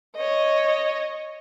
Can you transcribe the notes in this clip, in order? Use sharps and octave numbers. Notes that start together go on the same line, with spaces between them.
C#5 D#5